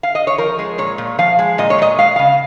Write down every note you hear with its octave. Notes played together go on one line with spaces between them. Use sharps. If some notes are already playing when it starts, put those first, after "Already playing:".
F5
D#5
C#5
F3 A#4
G#3
A#2 C#5
A#2
F3 F5
G#3
A#2 D#5
C#5
A#2 D#5
G#3 F5
C#3 F5